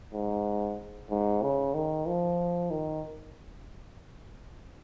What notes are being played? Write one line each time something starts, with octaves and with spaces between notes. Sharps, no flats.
G#2
G#2
C#3
D#3
F3
D#3